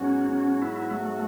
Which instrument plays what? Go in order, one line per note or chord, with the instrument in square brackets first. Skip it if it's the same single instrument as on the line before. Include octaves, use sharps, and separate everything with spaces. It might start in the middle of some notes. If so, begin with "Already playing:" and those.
Already playing: [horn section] G#2 F#3 B3 F#4 [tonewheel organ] C#4
[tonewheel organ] C#4
E4
A3